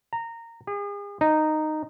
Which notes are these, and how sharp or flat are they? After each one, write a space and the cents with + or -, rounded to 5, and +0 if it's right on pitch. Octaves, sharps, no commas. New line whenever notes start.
A#5 -15
G#4 -40
D#4 -10